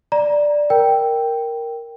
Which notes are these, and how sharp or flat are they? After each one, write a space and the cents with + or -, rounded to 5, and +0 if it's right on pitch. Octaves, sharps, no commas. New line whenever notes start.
D5 +0 A#5 +20
A#4 +0 G5 +0